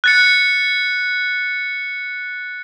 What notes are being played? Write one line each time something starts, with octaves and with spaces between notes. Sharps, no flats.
F#6 A6 C#7